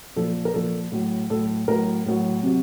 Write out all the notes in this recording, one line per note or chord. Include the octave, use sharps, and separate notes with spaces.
A#2 F3 A4
A#4
A#2 F3 A4
A2 F#3
A2 F#3 A4
A2 F#3 A#4
A2 F#3
C3 F#3